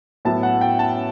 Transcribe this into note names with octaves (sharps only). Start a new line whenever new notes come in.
A2 F#3 B3 A5
F#5
G5
A5